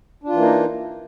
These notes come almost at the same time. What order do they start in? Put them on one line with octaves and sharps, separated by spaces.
D4 F4 E3 A#3 D#4